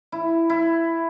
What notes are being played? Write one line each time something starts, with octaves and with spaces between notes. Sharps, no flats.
E4
E4